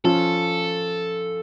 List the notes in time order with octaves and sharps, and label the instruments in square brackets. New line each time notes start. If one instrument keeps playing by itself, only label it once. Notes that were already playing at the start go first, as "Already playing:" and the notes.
[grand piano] F3 C#4 F4 [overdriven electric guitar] A4